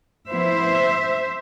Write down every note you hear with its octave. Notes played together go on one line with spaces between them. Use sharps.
F3 B3 E4 C5 E5